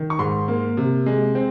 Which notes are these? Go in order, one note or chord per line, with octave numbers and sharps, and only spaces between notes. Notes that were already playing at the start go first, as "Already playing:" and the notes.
Already playing: D#3
C#6
G#2 C6
A#3
C3
G#3
C4